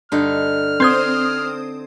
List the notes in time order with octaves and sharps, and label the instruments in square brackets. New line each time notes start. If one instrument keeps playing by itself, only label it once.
[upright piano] G2 [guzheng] D3 D#4 [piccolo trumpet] F6
[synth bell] C4 C5 D#6 [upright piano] C6 G#6